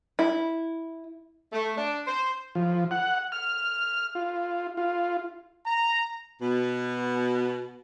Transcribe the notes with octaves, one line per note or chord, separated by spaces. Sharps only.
E4
A3
D4
C5
F3
F#5
F6
F4
F4
A#5
B2